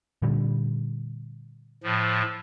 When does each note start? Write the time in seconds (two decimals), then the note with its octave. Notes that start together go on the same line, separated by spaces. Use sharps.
0.22 A#2 D3 G3
1.84 A2 F3